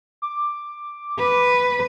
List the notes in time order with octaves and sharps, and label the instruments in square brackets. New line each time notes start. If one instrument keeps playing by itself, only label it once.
[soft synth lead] D6
[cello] B4